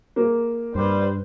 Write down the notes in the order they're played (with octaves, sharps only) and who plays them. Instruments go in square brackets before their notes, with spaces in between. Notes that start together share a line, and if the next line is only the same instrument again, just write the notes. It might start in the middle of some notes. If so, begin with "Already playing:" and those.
[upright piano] A#3 G#4
[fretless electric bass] G2 [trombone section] G3 [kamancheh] B4 C5